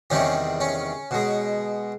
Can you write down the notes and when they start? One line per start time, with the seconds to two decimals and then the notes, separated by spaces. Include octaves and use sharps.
0.10 E2 C3 D#3 G3 C#4
0.60 C#4
1.11 B2 G#3